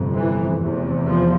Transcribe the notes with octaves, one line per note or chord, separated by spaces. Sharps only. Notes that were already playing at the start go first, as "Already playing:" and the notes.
Already playing: G1 F2 C3
E3
F1 E2 C3
F3